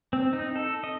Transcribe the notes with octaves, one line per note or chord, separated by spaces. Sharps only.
C4
D#4
A4
D#5